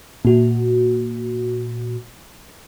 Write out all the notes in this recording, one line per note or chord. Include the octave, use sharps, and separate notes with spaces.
A#2 F#4